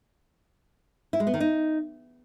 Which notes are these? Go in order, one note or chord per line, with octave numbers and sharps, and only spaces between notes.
E4
G#3
B3
D#3
D#4